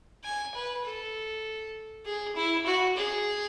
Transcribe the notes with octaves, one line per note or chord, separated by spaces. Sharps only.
G#5
B4
A4
G#4
E4
F#4
G#4